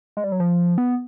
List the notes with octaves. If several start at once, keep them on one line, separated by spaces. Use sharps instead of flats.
G#3
G3
F#3
F3
B3